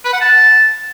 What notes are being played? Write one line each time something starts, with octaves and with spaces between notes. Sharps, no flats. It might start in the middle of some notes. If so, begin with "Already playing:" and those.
B4
F#5
A5